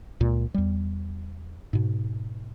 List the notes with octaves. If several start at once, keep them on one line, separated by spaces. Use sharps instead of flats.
C#2 A#2
E2 G3
G#2 B2